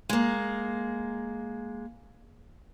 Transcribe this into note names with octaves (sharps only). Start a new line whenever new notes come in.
G#3 A#3